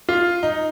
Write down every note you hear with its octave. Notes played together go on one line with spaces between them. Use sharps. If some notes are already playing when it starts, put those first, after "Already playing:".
F4
D#4